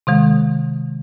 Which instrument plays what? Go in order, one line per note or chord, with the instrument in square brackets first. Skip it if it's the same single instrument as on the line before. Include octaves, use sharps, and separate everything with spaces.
[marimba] C3 D#3 G#3